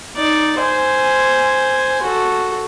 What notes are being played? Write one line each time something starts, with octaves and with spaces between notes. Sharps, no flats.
D#4 D5
C5 G#5
F#4 A4